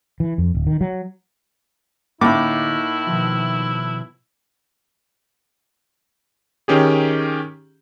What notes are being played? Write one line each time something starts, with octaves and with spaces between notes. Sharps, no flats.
E3
F2
D1
D#3
F#3
D2 A2 A#3 D#4 E4 D#5 B5 D6
B2 D#3 F3
D#3 C#4 G4 G#4